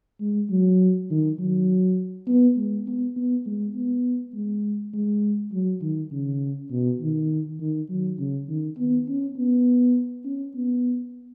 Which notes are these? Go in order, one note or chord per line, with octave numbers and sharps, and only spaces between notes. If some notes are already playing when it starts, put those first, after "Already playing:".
G#3
F#3
D#3
F#3
B3
G#3
B3
B3
G#3
B3
G#3
G#3
F#3
D#3
C#3
B2
D#3
D#3
F#3
C#3
D#3
B3
C#4
B3
C#4
B3